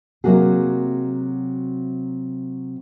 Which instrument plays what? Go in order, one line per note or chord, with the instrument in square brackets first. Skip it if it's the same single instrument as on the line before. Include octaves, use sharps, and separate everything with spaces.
[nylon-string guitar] C3 F#3 A#3 F#4 G#4